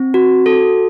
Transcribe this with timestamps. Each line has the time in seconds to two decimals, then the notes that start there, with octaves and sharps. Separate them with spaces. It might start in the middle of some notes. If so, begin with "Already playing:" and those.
Already playing: C4
0.14 F#4
0.46 A4